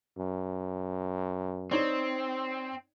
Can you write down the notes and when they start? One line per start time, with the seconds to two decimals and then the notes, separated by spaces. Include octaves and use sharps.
0.18 F#2
1.71 C4 D#4 C#5 D5